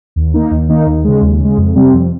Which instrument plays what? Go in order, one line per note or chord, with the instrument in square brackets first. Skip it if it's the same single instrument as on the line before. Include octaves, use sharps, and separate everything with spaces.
[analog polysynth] D#2
D#3 A#3 D#4
D#2
D#3 A#3 D#4
D#2
C#3 G#3
D#2
C#3 G#3
F2
C3 G3 C4
F2